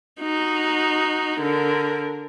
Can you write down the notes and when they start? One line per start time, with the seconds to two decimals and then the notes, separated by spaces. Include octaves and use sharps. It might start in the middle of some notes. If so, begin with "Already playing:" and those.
0.21 D#4 F#4
1.40 D3 A#4